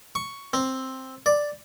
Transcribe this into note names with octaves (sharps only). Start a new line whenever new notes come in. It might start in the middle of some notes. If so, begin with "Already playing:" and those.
C#6
C4
D5